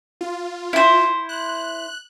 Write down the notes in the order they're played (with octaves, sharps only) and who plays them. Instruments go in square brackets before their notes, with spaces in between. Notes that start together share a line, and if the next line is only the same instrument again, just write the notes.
[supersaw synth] F4
[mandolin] E4 C5
[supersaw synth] F#6